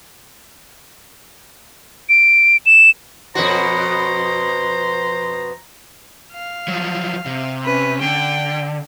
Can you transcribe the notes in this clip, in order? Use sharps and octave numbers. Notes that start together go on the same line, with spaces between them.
D7
E7
F2 B2 F#4 C5 A#5
F5
F3 F#3
C3
C#4 B4
D3 G5